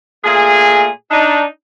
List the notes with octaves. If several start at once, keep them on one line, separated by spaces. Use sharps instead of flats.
A#2 A3 G#4
D4 D#4